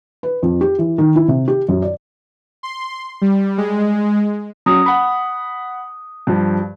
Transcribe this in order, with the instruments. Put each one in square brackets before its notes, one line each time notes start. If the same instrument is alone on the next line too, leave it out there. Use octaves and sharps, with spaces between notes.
[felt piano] B4
F2
G4
E3
D#3
E4
C3
G4
F#2
D5
[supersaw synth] C6
G3
G#3
[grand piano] F#3 C#4 F#4 [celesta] D#6
[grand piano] F#5 B5
G2 F3